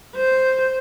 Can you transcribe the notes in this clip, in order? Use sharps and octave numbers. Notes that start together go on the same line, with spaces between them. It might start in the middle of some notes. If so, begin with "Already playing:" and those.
C5